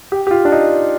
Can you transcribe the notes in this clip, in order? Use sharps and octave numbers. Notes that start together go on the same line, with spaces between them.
G4
G4
F4
D4
D#4